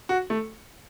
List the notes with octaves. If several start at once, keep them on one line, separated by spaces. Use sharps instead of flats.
F#4
A3